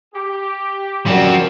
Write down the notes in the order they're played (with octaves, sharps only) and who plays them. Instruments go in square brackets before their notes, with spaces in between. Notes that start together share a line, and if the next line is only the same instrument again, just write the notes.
[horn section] G4
[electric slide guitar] F#2 C#3 F#4 [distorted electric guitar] F3 C4 [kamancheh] A#4 D5